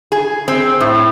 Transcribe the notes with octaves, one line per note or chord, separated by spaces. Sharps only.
G#4
C4
A2